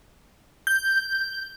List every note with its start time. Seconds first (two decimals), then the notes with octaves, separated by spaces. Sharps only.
0.67 G6